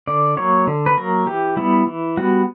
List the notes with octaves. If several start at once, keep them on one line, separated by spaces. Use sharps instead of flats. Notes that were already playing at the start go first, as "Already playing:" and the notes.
D3 D5
F#3 A#3 C#5
D3
B4
F#3 A#3 A#4
E3 G4
G3 B3 E4
E3
G3 B3 F#4